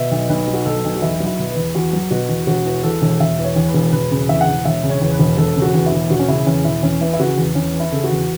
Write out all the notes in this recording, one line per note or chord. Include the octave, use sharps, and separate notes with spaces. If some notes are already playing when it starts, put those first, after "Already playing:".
Already playing: B2 E5
B1
B1 B4
F#3
F#4
B2 A4
B1
F#4
E2 E4
F#3
E4
B2
B4
E2
E2 F#4
F#3
B2 F#4
E2
E1 F#4
E3
E2 A4
E1
E1 E5
E3
C#5
E2
B4
E1
E1 B4
C#3
E2 E5
F#5
E1
E1 E5
C#3
C#5
E2
B4
E1
E1 A4
C#3
F#4
E2
E4
E1
E1 F#4
C#4
C#3 E4
E2 C#4
E1 E4
E2 C#4
E3 E4
E4
C#3 F#4
E2
E2 C#4
E3
E4
C#3 A4
F#4
E2